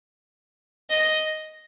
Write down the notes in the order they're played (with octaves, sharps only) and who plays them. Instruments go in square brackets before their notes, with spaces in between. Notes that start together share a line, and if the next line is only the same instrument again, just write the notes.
[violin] D#5